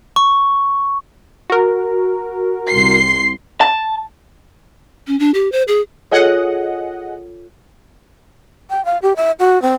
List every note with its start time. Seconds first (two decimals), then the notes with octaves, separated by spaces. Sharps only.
0.16 C#6
1.50 F#4 A#4
2.69 C2 C6 C7
3.61 A5
5.07 C#4
5.19 D4
5.34 G4
5.52 C5
5.68 G#4
6.12 F4 G#4 A4 C#5 D#5 F#5
8.70 G5
8.85 F5
9.02 G4
9.16 E5
9.40 F#4
9.62 C4